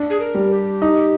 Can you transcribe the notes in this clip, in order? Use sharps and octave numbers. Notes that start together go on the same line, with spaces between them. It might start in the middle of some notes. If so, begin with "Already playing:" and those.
Already playing: D4
G#4
A#4
G3
G4
D#4